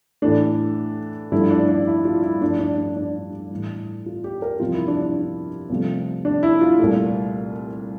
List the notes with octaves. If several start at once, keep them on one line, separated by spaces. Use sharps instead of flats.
A2 E3 A3 D4
G2 D3 F3 A3 E4
D4
D4
E4
F4
E4
G2 F3 A3 D4
D4
D4
D4
A2 E3 G3
F4
G4
A#4
F2 C3 E3 G3 F4
E4
D4
D4
C2 C3 F3 A3
D4
E4
F4
C2 A#2 A3